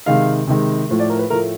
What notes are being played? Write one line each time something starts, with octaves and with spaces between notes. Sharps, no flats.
C3 D#3 G#3 F5
C3 D#3 G#3
A2 F3 A3
D5
A#4
B4
A2 F3 A3 A#4